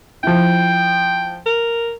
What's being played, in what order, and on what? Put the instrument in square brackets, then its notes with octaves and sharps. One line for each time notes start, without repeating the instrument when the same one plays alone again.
[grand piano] F3 E4 [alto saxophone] G5
[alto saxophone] A#4